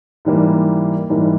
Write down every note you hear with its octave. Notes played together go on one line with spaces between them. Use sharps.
G#2 E3 G3 A#3
G#2 E3 G3 A#3